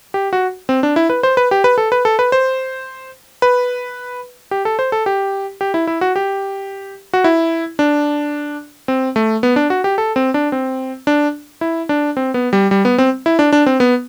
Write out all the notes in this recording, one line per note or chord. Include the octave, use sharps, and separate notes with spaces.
G4
F#4
C4
D4
E4
B4
C5
B4
G4
B4
A4
B4
A4
B4
C5
B4
G4
A4
C5
A4
G4
G4
E4
E4
F#4
G4
F#4
E4
D4
C4
A3
B3
D4
F#4
G4
A4
C4
D4
C4
D4
E4
D4
C4
B3
G3
G3
B3
C4
E4
D4
D4
C4
B3